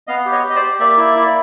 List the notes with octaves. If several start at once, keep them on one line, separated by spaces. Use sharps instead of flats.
B3 D#5 F5
G4
C#5 D#5
G4
D#5
C5 D5
G4
A#3 D5 E5
E4
E4